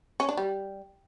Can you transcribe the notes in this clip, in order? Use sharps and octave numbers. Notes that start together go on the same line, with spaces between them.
C#4
D4
G3